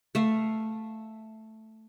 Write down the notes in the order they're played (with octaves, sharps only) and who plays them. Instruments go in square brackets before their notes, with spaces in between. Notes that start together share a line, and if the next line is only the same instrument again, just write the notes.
[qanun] A3 E5 F5